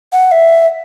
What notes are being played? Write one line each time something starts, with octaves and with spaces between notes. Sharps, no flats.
F#5
E5